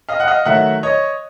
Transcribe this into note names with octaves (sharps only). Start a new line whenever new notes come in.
D#5 F5
F#5
D#5 F5
D#3 F#3 A3 E5 F#5
C#5 D#5